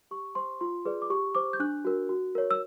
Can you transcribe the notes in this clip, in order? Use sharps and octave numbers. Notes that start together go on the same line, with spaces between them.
G4 C#6
C5 C6
F4 C6
G#4 B4 D5
D6
G4 C#6
C5 D6
G6
D4 F#6
F#4 A#4
F#4
A#4 C#5
E6